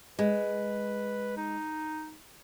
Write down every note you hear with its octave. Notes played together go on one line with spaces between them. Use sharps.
G#3 B4
D#4